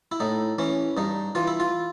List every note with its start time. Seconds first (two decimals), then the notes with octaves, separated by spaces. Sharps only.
0.12 E4
0.20 A2 D#4
0.58 E3 C#4
0.97 G2 D#4
1.35 E3 F4
1.47 E4
1.60 F4